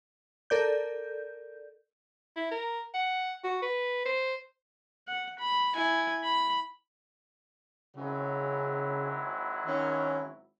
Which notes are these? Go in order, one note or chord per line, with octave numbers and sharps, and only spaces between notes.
A4 A#4 D5 G6
E4
A#4
F#5
F#4
B4
C5
F#5
B5
E4 G#5
B5
G#1 C#3 F#3 E4
D#3 C#4